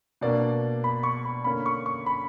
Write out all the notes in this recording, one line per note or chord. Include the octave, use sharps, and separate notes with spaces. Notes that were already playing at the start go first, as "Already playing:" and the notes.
B2 A#3 D4 D5
B5
C#6
B5
D3 A#3 C#4 B5
C#6
C#6
B5